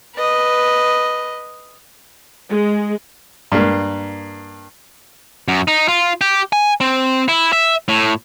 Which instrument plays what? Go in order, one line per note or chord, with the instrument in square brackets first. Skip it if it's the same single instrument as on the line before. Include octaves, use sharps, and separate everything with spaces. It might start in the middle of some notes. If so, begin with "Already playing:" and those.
[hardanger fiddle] B4 D#5
[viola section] G#3
[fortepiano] G2 A#3
[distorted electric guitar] F#2
D#4
F4
G4
G#5
C4
E4
E5
A2